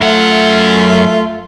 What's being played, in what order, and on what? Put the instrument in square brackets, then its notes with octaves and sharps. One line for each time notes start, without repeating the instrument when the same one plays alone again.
[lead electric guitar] F#2 F#5 [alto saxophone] A3 [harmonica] F4 E5